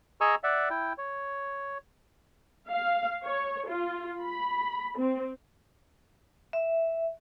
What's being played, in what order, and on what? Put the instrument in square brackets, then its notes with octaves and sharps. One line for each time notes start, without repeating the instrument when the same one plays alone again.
[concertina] G#4 D#5 G#5 A#5 C#6 E6
D5 E5 F#5
E4 G5
C#5
[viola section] F5
C#5
F4
B5
C4
[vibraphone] E5